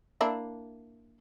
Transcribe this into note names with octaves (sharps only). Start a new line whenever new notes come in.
A#3 D4 E4